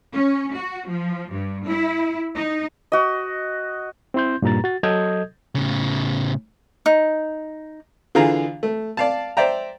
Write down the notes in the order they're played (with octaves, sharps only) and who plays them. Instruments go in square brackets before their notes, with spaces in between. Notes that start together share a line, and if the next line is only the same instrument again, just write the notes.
[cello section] C#4
F#4
F3
G2
E4
D#4
[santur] F#4 D#5
[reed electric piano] C4 E4 C6 G6
G2 A#2 A#5 A6
F#4 A6
F#3 A4 D#5 D#6 G6 G#6
[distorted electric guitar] A2 C#3
[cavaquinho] D#4
[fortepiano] D3 E3 F4 G#4 F5 A#5
A3
D5 F5 A5
C5 D5 E5 G5 A#5